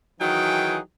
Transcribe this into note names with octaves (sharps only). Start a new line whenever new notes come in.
D#3 E3 F#3 D#4 G#4 G5